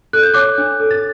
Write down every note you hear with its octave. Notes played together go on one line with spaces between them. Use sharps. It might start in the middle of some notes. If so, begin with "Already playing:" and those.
A4 F#6
G6
C#5 D6 F#6
D4
A4
A6